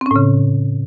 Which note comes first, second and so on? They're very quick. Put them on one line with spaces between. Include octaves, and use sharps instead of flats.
C4 C#4 A2 C#3